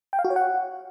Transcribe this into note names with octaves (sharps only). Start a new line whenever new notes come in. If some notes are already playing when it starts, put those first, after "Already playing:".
G5
F5
F#4
C#5
F#5